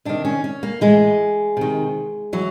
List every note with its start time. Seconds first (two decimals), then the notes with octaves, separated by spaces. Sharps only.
0.05 C3 D#3 D4
0.25 C#4
0.44 C#4
0.63 A#3
0.81 A2 E3 G#3
1.57 C3 D#3
2.33 E3 F#3